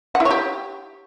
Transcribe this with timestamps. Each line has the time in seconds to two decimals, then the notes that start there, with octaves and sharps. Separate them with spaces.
0.15 F#5
0.20 E4
0.25 C#5
0.31 G4